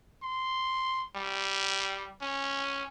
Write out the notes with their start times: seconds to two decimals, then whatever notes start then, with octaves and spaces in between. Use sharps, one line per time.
0.23 C6
1.15 G3
2.22 C#4